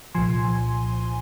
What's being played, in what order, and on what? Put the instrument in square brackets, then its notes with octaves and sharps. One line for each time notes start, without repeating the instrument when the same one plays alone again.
[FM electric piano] C2 A#2 F3 G#5 C6